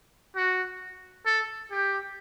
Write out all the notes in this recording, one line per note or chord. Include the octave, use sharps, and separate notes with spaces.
F#4
A4
G4